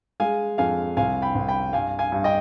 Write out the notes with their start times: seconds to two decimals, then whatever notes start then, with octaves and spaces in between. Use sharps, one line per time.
0.20 G#3 F5 G#5
0.58 F2 F5 G#5
0.97 C2 F5 G#5
1.22 G5 B5
1.35 C2
1.48 G5 B5
1.73 G2 F5 G#5
1.99 F5 G#5
2.12 G2
2.24 D#5 G5